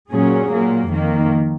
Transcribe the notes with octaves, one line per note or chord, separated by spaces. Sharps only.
A#2 F#3 C#4 G#4
A#2 F#3 A#3
F2 D#3 A#3